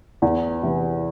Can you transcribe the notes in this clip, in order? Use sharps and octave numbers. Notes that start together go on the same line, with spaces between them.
E2
C3 E3